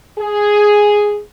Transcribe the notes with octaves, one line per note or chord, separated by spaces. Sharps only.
G#4